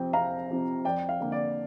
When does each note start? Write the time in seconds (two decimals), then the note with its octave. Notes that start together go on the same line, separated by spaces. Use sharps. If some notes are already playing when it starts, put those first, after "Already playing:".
Already playing: F2 C3 F3 C4 G5
0.13 F2 F5 A#5
0.49 C3 F3 C4
0.85 F2 D5 G5
1.09 F5
1.20 D3 A#3
1.32 D5